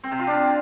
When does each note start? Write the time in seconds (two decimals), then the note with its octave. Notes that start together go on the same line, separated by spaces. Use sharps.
0.04 C4
0.11 C3
0.19 F4
0.27 D4